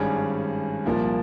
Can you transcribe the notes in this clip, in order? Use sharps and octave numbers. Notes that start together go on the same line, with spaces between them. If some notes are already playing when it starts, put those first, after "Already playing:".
Already playing: G#1 G2 G3 C#4 G#4
C2 A#2 F3 A#3